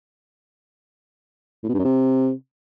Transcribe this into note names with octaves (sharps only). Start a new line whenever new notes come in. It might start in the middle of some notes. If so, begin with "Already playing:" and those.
A2
B2
G2
F#2
C3